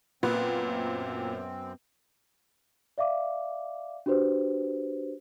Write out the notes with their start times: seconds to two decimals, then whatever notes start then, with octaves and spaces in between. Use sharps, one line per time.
0.23 F#2 A#2 B3 C4
2.98 D5 E5 F5 D6
4.06 D4 F#4 G4 B4 C5